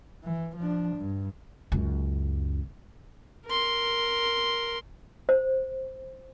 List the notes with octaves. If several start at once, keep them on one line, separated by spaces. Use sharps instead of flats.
E3
F3 D4
G2
C#2 F#2
A#4 C6
C5